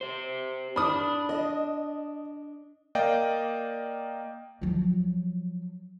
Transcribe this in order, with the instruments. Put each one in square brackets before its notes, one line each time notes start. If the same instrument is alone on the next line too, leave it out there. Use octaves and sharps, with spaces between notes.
[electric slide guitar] G4 C5
[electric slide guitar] D4 [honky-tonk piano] B5 D#6
[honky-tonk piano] D#5
[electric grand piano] A#3 D5 D#5 F5 G5
[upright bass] F3 F#3